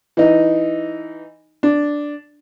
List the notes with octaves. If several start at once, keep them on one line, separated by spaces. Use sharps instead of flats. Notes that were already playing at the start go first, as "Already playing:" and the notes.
E3 D#4
D4